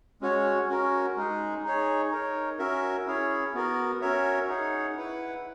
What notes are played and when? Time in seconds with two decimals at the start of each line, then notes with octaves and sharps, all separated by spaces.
0.21 G#3 C#4 F#4 C#5
0.68 C#4 F#4 A#4
1.16 G#3 D#4 G#4
1.63 D#4 G#4 C#5
2.11 D#4 A#4 C#5
2.59 C#4 F#4 A#4 E5
3.06 C#4 E4 G#4 C#5
3.54 B3 F#4 A#4
4.01 C#4 F#4 A#4 C#5 E5
4.48 D#4 G#4 C#5 F#5
4.96 E4 B4 F#5